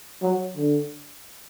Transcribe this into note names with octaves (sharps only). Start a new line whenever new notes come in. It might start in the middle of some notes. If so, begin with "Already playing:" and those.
F#3
D3